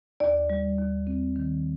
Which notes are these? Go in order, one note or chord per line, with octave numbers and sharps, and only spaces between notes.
D#2 D5
G3
D#2
C4
D#3